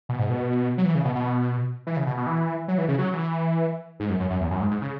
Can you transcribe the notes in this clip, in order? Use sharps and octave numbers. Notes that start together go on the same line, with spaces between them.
B2
G#2
B2
F#3
E3
C#3
B2
B2
E3
C#3
B2
B2
E3
F#3
E3
C#3
F#3
E3
G#2
F#2
F#2
F#2
E2
F#2
G#2
G#2
C#3